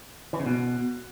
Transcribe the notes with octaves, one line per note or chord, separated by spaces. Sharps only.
E3
C#3
B2